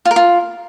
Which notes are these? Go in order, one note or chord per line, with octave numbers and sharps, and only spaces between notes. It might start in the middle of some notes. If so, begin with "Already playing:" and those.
F4
A#4
F4